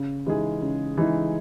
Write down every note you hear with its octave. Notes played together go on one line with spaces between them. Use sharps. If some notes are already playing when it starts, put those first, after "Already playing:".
Already playing: C#3
E3 G#3 D#4 G#4
C#3
E3 G#3 D#4 G#4